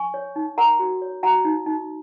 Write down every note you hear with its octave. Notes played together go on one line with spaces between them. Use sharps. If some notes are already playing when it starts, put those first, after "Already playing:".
Already playing: G#5 C#6
C#5
D#4
A#4 F#5 A#5
F#4
C#5
F#4 F#5 A#5
D#4
D#4